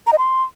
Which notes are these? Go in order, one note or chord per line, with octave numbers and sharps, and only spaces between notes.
A#5
D#5
C6